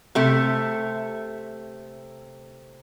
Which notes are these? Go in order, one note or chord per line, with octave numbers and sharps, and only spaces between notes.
C3 A3